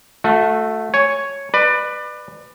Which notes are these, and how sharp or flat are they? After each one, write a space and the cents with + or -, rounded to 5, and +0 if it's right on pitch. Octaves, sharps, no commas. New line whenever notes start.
A3 +0 F#4 -35
C#5 +0 G#5 +0
B4 +0 D5 +30